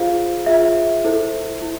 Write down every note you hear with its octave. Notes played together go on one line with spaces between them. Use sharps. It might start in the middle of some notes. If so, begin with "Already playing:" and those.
Already playing: F4 G#4 C5 F5
F4 G#4 C5 E5
E4 A4 C5
E4